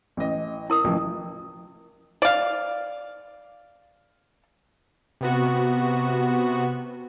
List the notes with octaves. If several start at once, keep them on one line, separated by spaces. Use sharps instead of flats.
A1 D#5
E4 A#4 D#6
A1 F3
D5 F5
C3 B3 F#4